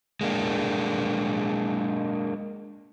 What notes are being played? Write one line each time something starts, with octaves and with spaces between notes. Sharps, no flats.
G#3 A#3 D4